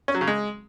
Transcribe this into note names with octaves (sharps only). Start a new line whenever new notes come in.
C#4
F#3
C#3
G#3